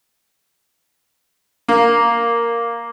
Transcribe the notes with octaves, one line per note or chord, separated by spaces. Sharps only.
A#3